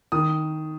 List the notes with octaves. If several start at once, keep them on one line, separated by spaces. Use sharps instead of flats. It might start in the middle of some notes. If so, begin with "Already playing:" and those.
D#3 D#6